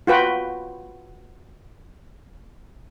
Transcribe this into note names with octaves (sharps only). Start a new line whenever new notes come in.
F4 F#4 B4 G5